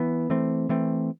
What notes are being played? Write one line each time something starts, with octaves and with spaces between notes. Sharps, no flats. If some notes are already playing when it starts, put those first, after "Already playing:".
Already playing: E3 B3
E3 A3 C4
E3 A3 C4